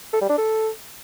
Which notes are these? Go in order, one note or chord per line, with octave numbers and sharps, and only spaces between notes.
A4
G3
D4
A4